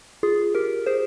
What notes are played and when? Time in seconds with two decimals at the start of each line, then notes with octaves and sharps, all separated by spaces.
0.23 F4 G#4
0.55 G4 A#4
0.86 G#4 C5